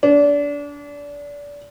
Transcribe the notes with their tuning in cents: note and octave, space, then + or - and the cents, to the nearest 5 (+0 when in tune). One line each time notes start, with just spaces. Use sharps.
D4 -25